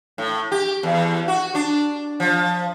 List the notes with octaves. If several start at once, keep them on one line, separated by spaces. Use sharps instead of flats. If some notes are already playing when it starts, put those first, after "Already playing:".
A2
G4
E2
F#4
D4
F3